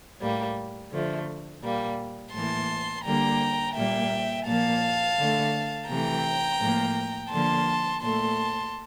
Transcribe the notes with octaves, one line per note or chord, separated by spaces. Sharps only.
A2 G3 A#3
D3 F3 A3
A#2 G3 A#3
A2 E3 A#3 A5 C6
D3 G3 A#3 G5 A#5
A#2 G3 A#3 E5 G5
A#2 F3 A#3 F5 A5
D3 A3
C3 E3 A3 G5 A#5
A2 F3 A#3
D3 F3 A#3 A5 C6
A#2 A3 A5 C6